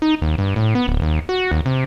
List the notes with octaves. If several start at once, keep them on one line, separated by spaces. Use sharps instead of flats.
D#4
D#2
G2
A2
B3
D1
D#2
F#4
D#2
C3